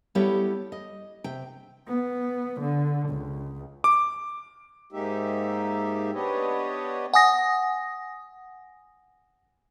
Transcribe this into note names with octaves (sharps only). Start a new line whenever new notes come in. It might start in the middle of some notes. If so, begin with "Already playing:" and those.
G3 B3 E4 G4 A4 C#5
D#5
C3 G5
B3
D3
C#2
D6
G#2 G#3 A#3 D#4 G4 E5
B3 D4 G4 B4 C#5 D#5
F#5 G#5 D#6 A#6